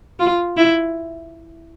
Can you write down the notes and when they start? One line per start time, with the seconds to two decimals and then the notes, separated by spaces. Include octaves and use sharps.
0.19 F4
0.57 E4